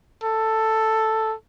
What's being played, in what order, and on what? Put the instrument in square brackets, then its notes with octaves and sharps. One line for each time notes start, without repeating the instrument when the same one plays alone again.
[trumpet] A4